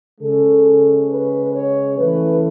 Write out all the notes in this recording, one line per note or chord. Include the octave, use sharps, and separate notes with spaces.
C#3 G#3 C#4 A4
B4
C#5
E3 A3 C#4 B4